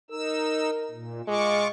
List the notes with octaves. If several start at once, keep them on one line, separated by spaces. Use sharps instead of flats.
D#4 A#4 E6
A#2
G#3 F4 C#6 D6